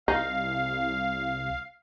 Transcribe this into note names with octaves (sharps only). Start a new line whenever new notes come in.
C2 D#4 F5